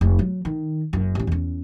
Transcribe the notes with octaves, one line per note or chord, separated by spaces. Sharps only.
F1
F#3
D#3
F#1 F#2
A1 C#4
E2 C#4